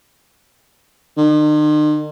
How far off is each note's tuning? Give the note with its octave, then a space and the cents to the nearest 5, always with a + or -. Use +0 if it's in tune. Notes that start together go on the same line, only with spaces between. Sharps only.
D#3 -45